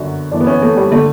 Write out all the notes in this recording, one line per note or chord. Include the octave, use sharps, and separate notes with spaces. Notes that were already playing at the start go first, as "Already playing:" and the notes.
Already playing: G1 F#2 D3 F#4
G1 F#2 E3 D4
B3
C#4
A3
G3
D3 A3